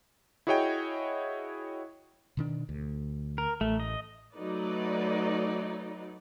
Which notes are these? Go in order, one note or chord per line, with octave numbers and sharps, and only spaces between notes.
E4 F#4 G#4 C#5 D#5 G5
B2 D#3 D4
D2
A#4
A1 A3
D#5
F#3 A3 D#4 B4 D5